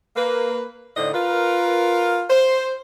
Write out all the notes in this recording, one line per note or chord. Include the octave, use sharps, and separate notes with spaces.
A#3 B4
A2 D3 D4 D#4 C5 D#5
F4 A#4 B4
C5